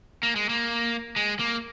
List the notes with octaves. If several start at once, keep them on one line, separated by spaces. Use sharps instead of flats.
A#3
G#3
A#3
G#3
A#3